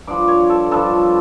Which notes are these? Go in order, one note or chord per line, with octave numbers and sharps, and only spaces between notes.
G2 F3 D5
C#5
A4
G2 F3 A4